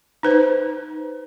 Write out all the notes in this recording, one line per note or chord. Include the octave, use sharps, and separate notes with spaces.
D#4 B4 C5